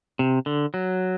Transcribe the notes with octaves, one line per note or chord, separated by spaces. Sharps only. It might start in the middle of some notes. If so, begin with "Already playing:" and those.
C3
D3
F#3